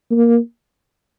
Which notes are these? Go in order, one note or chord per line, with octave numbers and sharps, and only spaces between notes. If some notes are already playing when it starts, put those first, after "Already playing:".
A#3